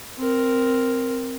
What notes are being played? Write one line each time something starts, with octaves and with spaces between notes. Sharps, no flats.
C4 A#4